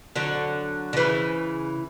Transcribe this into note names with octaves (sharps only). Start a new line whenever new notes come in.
D3 F#3
D3
C#3 E3